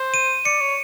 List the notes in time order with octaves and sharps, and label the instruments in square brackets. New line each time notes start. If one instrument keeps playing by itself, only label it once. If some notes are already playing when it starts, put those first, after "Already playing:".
Already playing: [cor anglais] C5
[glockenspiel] D#7
[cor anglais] D5 [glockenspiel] C#7
[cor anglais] C#5